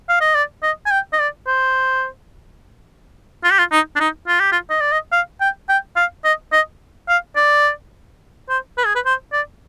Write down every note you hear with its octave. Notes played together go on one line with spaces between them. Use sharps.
F5
D#5
D5
D#5
G#5
G5
D#5
D5
C5
F4
G4
F4
D#4
D4
D#4
F4
G4
F4
D#5
D5
D#5
F5
G5
G5
F5
D#5
D#5
F5
D5
C5
B4
G#4
B4
C5
D5